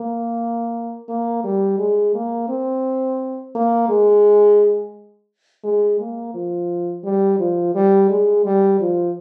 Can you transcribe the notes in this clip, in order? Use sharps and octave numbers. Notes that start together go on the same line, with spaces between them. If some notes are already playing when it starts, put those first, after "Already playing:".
Already playing: A#3
A#3
G3
G#3
A#3
C4
A#3
G#3
G#3
A#3
F3
G3
F3
G3
G#3
G3
F3